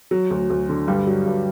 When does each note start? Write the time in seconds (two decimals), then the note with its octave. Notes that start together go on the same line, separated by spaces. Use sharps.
0.11 F#3
0.30 D2
0.50 D2
0.69 D3
0.88 G2 G3
1.07 F#3
1.26 G2